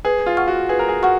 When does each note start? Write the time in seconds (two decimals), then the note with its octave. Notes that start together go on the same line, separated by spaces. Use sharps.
0.05 G#4 B4
0.26 F4
0.37 F#5 C#6 F6
0.48 F#4
0.69 G#4 B4
0.79 A#4
0.89 G#4
1.03 F#4 F#5 C#6 F6